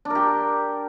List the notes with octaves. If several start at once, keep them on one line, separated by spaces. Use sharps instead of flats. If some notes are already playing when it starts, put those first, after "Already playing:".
D4
A#4
G4